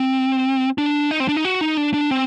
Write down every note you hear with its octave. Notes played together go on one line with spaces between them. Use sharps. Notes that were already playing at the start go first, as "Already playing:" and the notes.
Already playing: C4
D4
D#4
C4
D4
D#4
F#4
D#4
D4
D4
C4